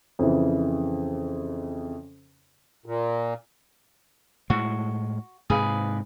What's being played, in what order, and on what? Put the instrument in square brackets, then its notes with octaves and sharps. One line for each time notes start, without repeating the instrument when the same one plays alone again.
[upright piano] F2 C#3 E3
[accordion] A#2
[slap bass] A2 G#3 [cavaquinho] F#4
[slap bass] G#2 C3 [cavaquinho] G#4 B4 F5